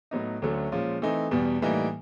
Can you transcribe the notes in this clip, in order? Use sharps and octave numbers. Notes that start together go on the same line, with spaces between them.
A2 F#3 B3 D#4
D2 D3 F#3 A3 C#4
A#2 F3 G#3 C#4
E3 A3 C4 D#4
E2 B2 G3
A2 E3 G3 A#3 D#4